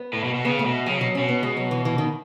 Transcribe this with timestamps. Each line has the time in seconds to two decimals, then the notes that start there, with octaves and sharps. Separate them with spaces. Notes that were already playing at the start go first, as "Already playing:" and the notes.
Already playing: B3
0.13 A2
0.24 B2
0.34 B2
0.45 C#3 B3
0.59 A3
0.65 B2
0.86 C#3 F#3
0.97 B2 F#3
1.15 B2 C#4
1.28 B3
1.43 G#3
1.57 F#3
1.71 E3
1.85 E3
1.98 D#3